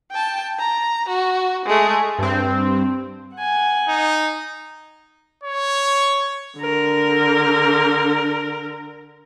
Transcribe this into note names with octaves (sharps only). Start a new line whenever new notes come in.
G5 A5
A#5
F#4
G#3 A3
G2 C4
F#5 G#5
D#4
C#5
D3 A#4